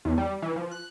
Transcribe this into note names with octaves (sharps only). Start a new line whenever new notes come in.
E2
G3
E3
F3
F#6